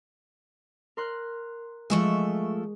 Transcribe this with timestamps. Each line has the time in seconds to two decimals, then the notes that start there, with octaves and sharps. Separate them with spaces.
0.97 A#4 C6 F#6
1.90 F3 G#3 A3 E5 C#6